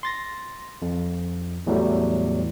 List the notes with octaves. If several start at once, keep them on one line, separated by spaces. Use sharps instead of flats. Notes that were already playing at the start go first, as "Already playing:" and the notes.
C6 A6 A#6
F2
E2 A2 F#3 G3 A3